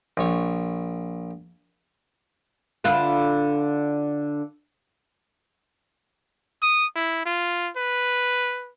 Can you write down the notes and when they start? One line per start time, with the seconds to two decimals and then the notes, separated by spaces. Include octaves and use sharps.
0.17 A#1 C#5
2.84 D3 F4 B4
6.63 D#6
6.96 E4
7.26 F4
7.77 B4